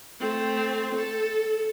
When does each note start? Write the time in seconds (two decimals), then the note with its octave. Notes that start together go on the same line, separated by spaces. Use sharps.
0.20 A3 C4
0.94 A4